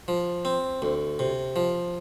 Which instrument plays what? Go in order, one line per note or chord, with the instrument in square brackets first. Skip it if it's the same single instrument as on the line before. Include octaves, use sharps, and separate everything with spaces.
[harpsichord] F3
C4
D2
C3
F3